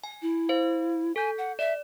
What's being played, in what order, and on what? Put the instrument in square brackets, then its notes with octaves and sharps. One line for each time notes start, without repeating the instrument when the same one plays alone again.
[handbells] G#5
[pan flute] E4
[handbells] C5 F5
[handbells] A4 G6 [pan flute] G#5
[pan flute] F#5
[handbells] D5 [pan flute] E5